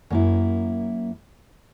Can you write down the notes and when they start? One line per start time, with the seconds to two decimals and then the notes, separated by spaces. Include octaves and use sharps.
0.10 F#2 A#3 E4